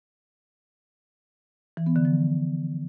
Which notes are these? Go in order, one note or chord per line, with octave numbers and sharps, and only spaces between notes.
E3
B3
D3
F3